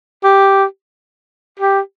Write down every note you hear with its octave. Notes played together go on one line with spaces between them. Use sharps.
G4
G4